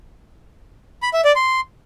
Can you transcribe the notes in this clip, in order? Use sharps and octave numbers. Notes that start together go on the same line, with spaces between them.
B5
E5
D5
C6